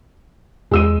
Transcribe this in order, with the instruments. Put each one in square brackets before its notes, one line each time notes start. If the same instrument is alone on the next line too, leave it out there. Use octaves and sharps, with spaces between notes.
[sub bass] E2 [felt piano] G#3 E6 D#7